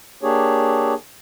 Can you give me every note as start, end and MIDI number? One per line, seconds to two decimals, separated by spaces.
0.23 0.94 58
0.23 0.94 62
0.23 0.94 67
0.23 0.94 68
0.23 0.94 73